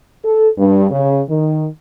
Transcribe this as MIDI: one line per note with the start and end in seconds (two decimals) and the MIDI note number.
0.24 0.48 69
0.58 0.88 43
0.90 1.20 49
1.29 1.66 51